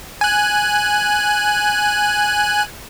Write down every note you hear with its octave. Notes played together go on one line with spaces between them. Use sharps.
G#5 F#6